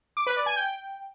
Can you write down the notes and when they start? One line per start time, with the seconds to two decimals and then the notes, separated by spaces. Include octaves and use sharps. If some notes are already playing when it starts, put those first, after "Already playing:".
0.17 D6
0.27 B4
0.36 D5
0.46 G#5
0.56 G5